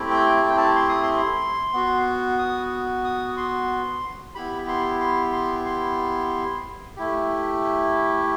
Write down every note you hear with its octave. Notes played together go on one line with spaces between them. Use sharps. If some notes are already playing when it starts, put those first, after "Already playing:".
Already playing: A3 C4 E4 G4
G5
A5
G5
A5
C6
D#6
C6
B3 F#4
D#6
D#6
C6
B3 E4 G4 B5
C6
C6
C6
C6
A3 E4 G4